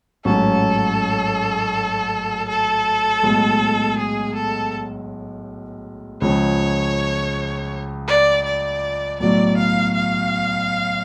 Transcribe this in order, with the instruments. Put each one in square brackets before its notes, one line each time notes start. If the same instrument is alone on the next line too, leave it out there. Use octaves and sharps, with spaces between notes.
[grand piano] A1 G#2 F#3 C#4 [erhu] A4
[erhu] A4
[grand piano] B1 A2 G#3
[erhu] G#4
A4
[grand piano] C#2 C#3 F3 [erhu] C#5
[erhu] D5
D5
[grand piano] B1 A2 F#3 [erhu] D5
[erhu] F5
F5